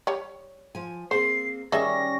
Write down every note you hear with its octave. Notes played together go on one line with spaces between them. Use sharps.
G3 C#5
F3 G#5
A#3 C4 G#4 C5 C7
D#3 G3 C#4 G#4 D#5 E5 A#6